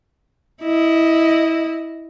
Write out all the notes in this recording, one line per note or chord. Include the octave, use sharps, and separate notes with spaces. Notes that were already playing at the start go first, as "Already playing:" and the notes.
E4 D#5